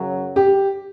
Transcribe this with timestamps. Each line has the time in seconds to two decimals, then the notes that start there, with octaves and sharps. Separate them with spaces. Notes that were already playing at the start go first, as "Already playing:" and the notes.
Already playing: F#2 C#3 F#3
0.36 G4